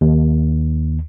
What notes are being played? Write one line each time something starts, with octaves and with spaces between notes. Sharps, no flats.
D#2